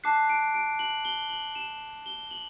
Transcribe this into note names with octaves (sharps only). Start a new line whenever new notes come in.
A5 D6 F#6 C7
D7
D7
F#7
G7
F#7
E7
G7
F#7